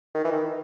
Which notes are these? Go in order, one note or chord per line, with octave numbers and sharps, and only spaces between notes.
D#3
E3
D#3